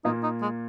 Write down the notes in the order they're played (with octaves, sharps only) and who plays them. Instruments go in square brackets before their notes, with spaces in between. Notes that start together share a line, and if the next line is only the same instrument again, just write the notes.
[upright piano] A#2 A#3 [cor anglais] D#4
[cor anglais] D#4
G#3